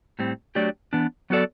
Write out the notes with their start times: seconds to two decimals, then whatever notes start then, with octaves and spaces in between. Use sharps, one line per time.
0.19 A2 G3 C4
0.55 F#3 A3 D4 G4 D5
0.93 E3 B3 D4
1.30 F#3 B3 F#4 A4 D5